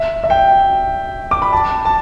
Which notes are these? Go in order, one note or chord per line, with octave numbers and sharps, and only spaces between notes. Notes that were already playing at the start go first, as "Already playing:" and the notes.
Already playing: E5
E5
G5
D6
B5
A5
A5